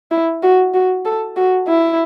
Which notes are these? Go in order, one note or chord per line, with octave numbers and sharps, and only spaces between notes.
E4
F#4
F#4
A4
F#4
E4